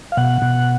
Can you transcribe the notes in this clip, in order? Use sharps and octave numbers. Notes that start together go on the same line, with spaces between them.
F5
B2 F#5
B2